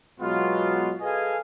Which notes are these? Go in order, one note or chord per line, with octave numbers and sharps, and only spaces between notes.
B2 F#3 G#3 B3 F4
G#4 A4 B4 D#5 F5 G#5